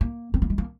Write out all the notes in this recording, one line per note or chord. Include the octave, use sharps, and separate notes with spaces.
A#3
C4
A#3
G#3
A#3